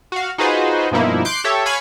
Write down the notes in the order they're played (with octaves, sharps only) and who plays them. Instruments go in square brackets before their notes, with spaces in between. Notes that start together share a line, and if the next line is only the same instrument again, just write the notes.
[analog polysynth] F#4 F5
D#4 F4 F#4 G#4 B4 C5
G2 B2 F3 A#3 D#4 E4
C6 D6 F#6 G6 C7 D7
G4 A4 C#5 E5
C#5 F5 G#5 B5 C#6 G#6